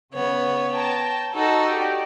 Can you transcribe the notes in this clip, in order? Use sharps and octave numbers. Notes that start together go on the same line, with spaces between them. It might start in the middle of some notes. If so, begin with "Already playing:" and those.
C#3 B3 C#5
G5 A5 A#5
D#4 F#4 A4
G4 D5